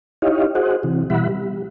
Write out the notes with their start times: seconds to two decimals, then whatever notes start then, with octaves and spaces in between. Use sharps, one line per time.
0.22 D#4 E4 G4 C#5 D#5 F5
0.55 F#4 G#4 C5 D#5 F#5
0.83 C3 E3
1.10 B2 E3 G3 E5 F#5 B5
1.29 G3